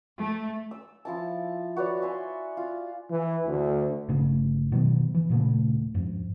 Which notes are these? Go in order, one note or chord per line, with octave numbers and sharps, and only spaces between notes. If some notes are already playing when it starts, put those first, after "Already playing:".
A3
E6
F3 E4 A5
F#4 B4 C#5 D5
E5 G#5 C6
F4
E3
D2
G1 C#3 A3
B2 D#3 F#3 G3
E3
D#2 A#2 C#3 A3
F2 G#2